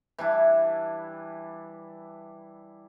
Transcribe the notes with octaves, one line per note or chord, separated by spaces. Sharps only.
E3 G3 D4 E4